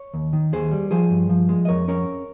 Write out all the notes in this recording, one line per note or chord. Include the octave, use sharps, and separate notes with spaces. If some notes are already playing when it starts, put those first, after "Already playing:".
Already playing: C#5
D#2
D#3
D#2 G#4 C5
G3
F3 G#4 C5
G2
F3
G#3
D#5
F2 A#4 C#5
C#4 A#4 C#5